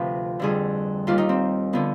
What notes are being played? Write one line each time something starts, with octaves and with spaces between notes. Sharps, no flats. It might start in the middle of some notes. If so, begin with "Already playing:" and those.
Already playing: D2 C3 F3 F4 B4
F2 D3 G3 G#4
D#2 D#3 G3 F4
D#4
C4
D3 F3 B3